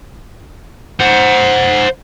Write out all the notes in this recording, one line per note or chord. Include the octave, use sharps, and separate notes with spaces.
C5 F#5